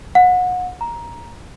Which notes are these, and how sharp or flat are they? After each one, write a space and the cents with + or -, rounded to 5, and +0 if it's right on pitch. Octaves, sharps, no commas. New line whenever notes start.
F#5 -30
A#5 +10